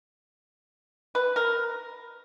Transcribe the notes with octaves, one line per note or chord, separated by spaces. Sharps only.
B4
A#4